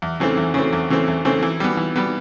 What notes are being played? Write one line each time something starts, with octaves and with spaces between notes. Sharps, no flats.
E2
C#3 E3 A3 C4
E2
C#3 E3 A3 C4
E2
C#3 E3 A3 C4
E2
C#3 E3 A3 C4
E3
G3 B3
E3
G3 B3